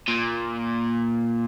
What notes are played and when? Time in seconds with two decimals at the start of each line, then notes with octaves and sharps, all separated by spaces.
0.08 A#2